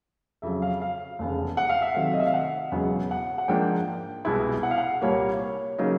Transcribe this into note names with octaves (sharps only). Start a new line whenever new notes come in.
F2 C#3 F#3 E5
F5
F5
F1 E2 C#3
F#5
F5
E5
C3 D#3 F#3 A3 C4 F5
D#5
E5
F5
F#5
E1 E2 C#3 F#3 B3
F#5
F#5
G#2 F3 A#3 D4 G5
C2 B2 G#3 B3 E4
F#5
F5
F#5
C2 A#2 G3 A#3 C#5
C#5
C#3 F#3 A#3 D#4